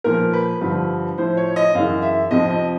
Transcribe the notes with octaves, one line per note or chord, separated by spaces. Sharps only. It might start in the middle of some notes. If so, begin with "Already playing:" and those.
A#2 F3 A#4
B4
G2 D3 F3 B4
A2 F3 C5
C#5
D#5
F#2 C#3 E3 F5
E5
F2 C3 F3 D#5
D#5